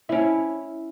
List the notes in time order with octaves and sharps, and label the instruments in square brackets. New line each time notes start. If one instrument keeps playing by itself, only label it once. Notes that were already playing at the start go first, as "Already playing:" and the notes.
[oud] C#4 E4